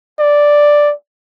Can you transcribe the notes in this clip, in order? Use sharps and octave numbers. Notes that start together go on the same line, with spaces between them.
D5